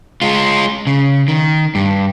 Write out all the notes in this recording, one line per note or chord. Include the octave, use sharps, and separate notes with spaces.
G#3 F4
C#3
D#3
G2